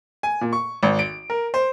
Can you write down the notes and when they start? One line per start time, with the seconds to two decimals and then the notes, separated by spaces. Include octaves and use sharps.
0.23 G#5
0.41 A#2
0.53 C#6
0.83 G#1
0.99 D7
1.30 A#4
1.54 C5